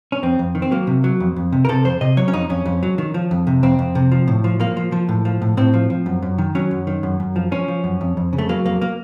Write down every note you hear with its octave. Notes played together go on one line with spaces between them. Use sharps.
C#4
F2 C4
F2
D#3
C4
F#3 A#3
C3
F#3
F2
F2
C3
A#4
C3 A4
F2 C5
C3 D#5
F#3 C#5
C#4
F2 D#4
F2 C#4
F2
F#3
D#3
F3
F2
C3
F2 C4
F2
C3
F3
A2
F3
F3 A#3
F3
F3
A2
F3
A2
A2 C4
F3
F3
F#2
F#2
D#3
F#3 C#4
F#2
D#3
F#2
F#2
F3
F3 C#4
F3
F#2
F2
F2
C#3
A3
F#3 A#3
F2 A#3
A#3